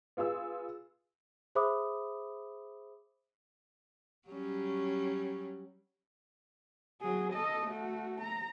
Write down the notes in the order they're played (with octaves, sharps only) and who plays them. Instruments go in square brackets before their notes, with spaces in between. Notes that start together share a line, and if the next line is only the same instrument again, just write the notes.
[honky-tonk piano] B3 F4 G#4 E6
[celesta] G#4 C5 E5 B5 D6 D#6
[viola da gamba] F#3 G3 C#4
[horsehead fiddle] F#3 G#4
A4 D#5
A3 F#4
A#5